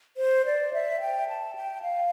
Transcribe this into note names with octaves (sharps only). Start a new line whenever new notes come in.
C5
D5
E5
G5
A5
G5
F5